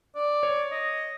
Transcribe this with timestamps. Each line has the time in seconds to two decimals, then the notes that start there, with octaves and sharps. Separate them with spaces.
0.15 D5
0.43 C#5
0.71 D#5